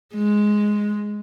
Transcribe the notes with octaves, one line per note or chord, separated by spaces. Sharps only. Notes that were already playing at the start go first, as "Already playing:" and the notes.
G#3